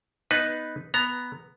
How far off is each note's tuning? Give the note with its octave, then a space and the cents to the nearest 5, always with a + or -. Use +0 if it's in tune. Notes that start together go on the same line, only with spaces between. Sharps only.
B3 +0 D#4 +0 B4 +0
B3 +0 A#5 +0